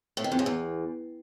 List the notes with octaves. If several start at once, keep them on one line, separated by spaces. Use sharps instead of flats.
A2
D#3
F2
C#3
E2